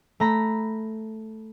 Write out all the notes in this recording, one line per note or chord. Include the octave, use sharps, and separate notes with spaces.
A3 A#5 B5